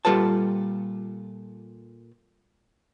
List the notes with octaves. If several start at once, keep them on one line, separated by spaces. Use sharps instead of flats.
A#2 G3 F4 A4 B4 A5